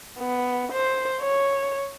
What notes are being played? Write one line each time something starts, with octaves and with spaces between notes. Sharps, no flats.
B3
C5
C#5